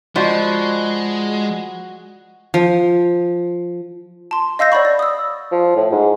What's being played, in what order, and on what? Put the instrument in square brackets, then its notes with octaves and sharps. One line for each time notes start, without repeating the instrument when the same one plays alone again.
[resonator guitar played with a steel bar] F3 [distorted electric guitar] G#3 [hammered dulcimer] F#4 [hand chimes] D5 D#5 B5
[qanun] F3
[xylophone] A5 C6
D#5 F5 E6 G6 A#6
C#5 D5 F#5 B5 C#6
D5
D#6 E6
[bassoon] F3
A2
G#2